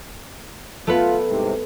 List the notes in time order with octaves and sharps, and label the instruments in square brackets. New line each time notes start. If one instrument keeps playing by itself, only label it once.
[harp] A3 B3 B4 [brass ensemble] F4
[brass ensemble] C2 G#2 C3